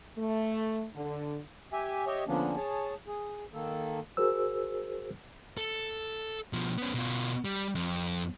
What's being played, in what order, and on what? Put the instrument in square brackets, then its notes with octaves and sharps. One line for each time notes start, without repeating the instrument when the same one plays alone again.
[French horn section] A3
D3
[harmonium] G4 E5 G#5
G4 C#5 D#5 E5
D3 F3 A#3 B3 C#4 D4
G#4 C#5 A5
G#4
D#3 A#3 A4
[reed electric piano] F#4 G#4 A#4 C5 E6
[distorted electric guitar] A4
B2 F3
B3 C#4
B2 F4
G3
F2